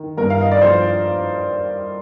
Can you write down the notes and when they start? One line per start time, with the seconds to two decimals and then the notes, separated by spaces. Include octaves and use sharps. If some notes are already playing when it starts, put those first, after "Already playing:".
Already playing: D#3
0.17 G2 A#4
0.30 F5
0.41 D#5
0.52 D5
0.61 F3 C5